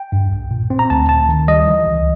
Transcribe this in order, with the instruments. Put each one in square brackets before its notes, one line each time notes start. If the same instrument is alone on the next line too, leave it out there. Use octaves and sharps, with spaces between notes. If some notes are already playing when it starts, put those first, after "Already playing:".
Already playing: [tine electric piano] G5
G2
B1
A#2
C4
A#5
D2 A5
D2 A5
D#3
G3 D#5
E3
C#2